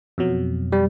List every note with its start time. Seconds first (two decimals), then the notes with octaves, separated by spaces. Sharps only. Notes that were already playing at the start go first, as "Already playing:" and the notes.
0.18 F2 B2 F#3
0.72 G3